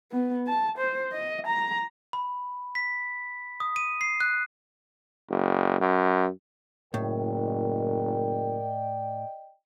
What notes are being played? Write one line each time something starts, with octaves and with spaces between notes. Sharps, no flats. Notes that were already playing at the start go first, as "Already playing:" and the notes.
B3
A5
C5
D#5
A#5
B5
B6
D#6
D#7
C7
F#6
F#1
F#2
F#1 A2 A#4 D5 D#5 G5